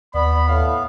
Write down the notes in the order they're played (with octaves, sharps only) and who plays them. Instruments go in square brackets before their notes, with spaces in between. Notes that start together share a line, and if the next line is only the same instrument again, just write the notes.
[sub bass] D#2 [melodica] B3 [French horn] D5 [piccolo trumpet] B5
[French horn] A2 [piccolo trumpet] F5